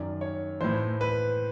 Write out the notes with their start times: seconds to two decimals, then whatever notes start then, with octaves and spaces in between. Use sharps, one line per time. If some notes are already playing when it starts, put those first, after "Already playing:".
Already playing: F#2 D#3 D5
0.21 C#5
0.61 A2 E3 C5
1.01 B4